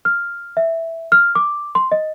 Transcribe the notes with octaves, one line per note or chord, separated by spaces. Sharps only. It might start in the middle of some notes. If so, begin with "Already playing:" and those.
F6
E5
F6
D6
C6
D#5